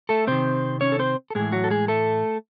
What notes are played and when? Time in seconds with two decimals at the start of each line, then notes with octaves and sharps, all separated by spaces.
0.09 A3 A4
0.27 C3 D#3 C4 C5
0.81 C#4 C#5
0.92 A4
0.99 C4 C5
1.30 A4
1.35 A2 E3 G#3 G#4
1.52 F#3 F#4
1.64 A4
1.70 G#3 G#4
1.88 A3 A4